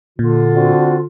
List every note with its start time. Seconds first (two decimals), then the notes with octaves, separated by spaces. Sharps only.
0.19 A#2 D3 F4
0.55 C4 D4 F#4